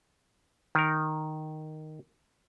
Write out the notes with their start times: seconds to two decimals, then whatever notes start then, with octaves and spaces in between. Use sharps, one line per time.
0.75 D#3 A#4